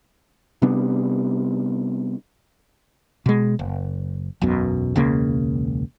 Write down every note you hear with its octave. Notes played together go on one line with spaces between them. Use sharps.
C3 G3 B3 D4
B2 G#3
F#1
E1 B1 F#2 B2
E1 C#2 C#3 A#3